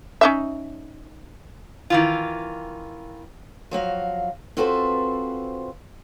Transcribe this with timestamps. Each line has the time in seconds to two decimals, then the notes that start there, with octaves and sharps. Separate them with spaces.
0.21 C#4 D#4 E5
1.90 D#3 E3 F4
3.71 F3 F#3 F#4 F5
4.57 C4 F4 F#4 A4 B4 C5